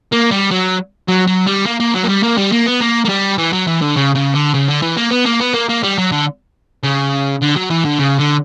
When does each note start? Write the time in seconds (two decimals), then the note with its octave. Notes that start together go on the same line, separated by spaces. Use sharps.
0.12 A#3
0.31 G3
0.51 F#3
1.08 F#3
1.27 F#3
1.47 G3
1.66 A#3
1.80 A#3
1.94 F#3
2.03 A#3
2.09 G3
2.23 A#3
2.37 G3
2.52 A#3
2.66 B3
2.81 A#3
3.05 A#3
3.09 G3
3.38 E3
3.53 F#3
3.67 E3
3.81 D3
3.96 C#3
4.15 C#3
4.34 D3
4.54 C#3
4.68 D3
4.82 E3
4.97 A#3
5.11 B3
5.26 A#3
5.40 B3
5.54 A#3
5.69 A#3
5.83 G3
5.98 F#3
6.12 D3
6.83 C#3
7.42 D3
7.56 F#3
7.70 E3
7.85 D3
7.99 C#3
8.19 D3